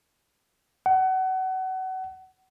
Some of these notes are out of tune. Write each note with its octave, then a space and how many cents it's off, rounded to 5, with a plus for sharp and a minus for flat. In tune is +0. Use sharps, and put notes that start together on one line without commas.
F#5 +30